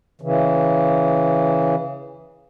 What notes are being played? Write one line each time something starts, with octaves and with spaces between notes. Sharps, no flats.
C#3 E3